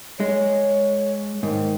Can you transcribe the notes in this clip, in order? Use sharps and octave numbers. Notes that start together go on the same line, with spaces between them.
G#3 C#5
G#2 D#3